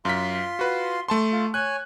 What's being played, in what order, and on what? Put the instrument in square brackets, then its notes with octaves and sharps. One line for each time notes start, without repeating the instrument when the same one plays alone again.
[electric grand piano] F#2 B6 [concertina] F4 C6
[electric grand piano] F#4 B4
A3 A5 C6
[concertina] F4
[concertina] C#5 G#5 [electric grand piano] F#6